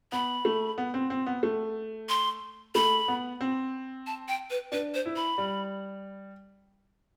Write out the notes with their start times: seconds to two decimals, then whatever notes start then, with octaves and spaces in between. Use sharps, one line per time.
0.12 B3 B5
0.45 A3
0.78 B3
0.94 C4
1.10 C4
1.26 B3
1.43 A3
2.09 C6
2.75 A3 B5
3.08 B3
3.41 C4
4.07 A5
4.28 G5
4.50 B4
4.72 D4 B4
4.94 C5
5.05 E4
5.16 B5
5.38 G3